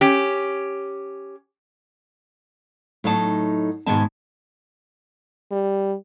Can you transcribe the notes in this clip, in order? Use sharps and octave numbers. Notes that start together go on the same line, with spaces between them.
C#4 G4
A2 F#3 D#4 A5
G#2 B2 D#3 G#3 G#5 A5
G3